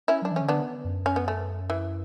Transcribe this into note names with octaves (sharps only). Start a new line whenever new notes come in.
C#4 E4
F#3 D4
E3
C#4
D3
B3 D4
F#2
C#4
B3
A3 C#4
E3